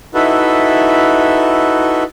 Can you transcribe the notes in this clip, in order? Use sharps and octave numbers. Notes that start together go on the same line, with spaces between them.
D#4 E4 F#4 A4 B4 E5